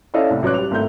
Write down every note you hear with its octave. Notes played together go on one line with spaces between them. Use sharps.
C#4 E4 A4 D5 D#5 F5
C2 A2
A1 F#3 D6 F#6
G3 F7
G#1 A2 A3 G6